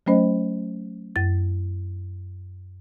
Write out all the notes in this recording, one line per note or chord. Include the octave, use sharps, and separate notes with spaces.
F#3 A3 C#4 C5 D#5
F#2 A6